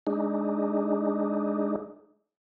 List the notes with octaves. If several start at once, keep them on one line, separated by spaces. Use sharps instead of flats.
G#3 D4 D#4